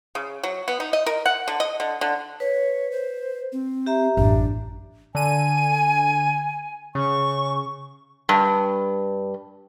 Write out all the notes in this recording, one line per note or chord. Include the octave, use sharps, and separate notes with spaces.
C#3
F#3
B3
D#4
D#5
A#4
F#5
D3
D#5
D3
D3
B4 C#5
C5
C4
G4 E5 A#5
A1 F#2 D4
D3 G#5 D#7
C#3 C#6
G2